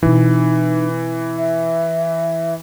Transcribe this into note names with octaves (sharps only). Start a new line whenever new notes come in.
B2 E3 C4 D#4
E5